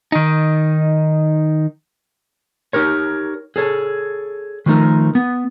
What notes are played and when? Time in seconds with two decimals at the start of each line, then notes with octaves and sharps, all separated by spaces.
0.12 D#3 D#4
2.73 D#4 G4 A#4 C#5
3.56 G#4 A4 C#5
4.66 D#3 F3 A3 D#4 A#4
5.15 B3